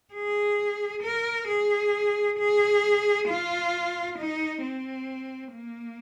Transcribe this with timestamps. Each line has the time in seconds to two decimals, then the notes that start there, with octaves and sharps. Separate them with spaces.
0.14 G#4
1.03 A#4
1.48 G#4
2.38 G#4
3.28 F4
4.18 D#4
4.62 C4
5.53 A#3